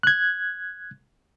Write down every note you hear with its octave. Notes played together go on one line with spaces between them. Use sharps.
F#6 G#6